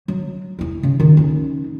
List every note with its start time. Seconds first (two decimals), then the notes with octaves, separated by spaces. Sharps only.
0.08 F#3
0.59 E2 E4
0.83 C#3
1.00 D#3 F3
1.17 C#4 D#4